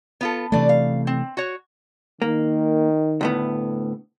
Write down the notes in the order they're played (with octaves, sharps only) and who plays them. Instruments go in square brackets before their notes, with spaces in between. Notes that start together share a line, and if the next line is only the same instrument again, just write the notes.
[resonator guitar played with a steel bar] B3 F4 A4
[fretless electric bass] C3 E3 A3 [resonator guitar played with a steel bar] D4 D5
[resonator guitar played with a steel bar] F5
C4
F#4 C#5
[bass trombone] D#3 [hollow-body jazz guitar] A#3
[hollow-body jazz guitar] D2 A2 B3